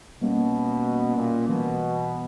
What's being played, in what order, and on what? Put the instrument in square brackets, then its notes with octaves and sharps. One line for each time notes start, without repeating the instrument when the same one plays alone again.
[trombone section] B2 [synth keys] G3 A#3 C#4
[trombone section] A#2
[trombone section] B2 [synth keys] E3 G3 B3